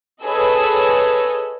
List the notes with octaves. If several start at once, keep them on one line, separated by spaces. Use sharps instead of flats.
G#4 A4 B4 C#5 D#5 E6